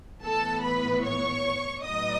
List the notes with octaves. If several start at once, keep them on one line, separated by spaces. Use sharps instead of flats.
A2 E3 B3 A4 A5
B4 B5
C#5 C#6
A2 F#3 B3 D#4 D#5 D#6